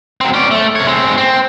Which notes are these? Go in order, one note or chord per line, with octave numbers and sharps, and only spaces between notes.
F#3 C4
C#4 D5
A3
C3 C#5
G#3 C4
C4